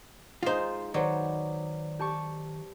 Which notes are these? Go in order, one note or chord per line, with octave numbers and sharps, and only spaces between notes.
G#3 D#4 F4 C5
D#3 F#3 B4 C5 D5
G4 A5 C#6